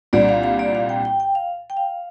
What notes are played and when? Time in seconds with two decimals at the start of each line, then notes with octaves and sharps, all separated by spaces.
0.13 C2 A#2 G3 D4 D5
0.29 F5
0.43 F5
0.59 D5
0.75 F5
0.89 G5
1.05 G5
1.20 G5
1.35 F5
1.70 G5
1.77 F5